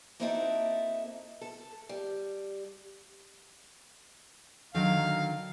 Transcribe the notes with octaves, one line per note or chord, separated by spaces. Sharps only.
A#3 C4 D#4 E4 F#4 A4
A4
G3
D3 D#3 F#3 F5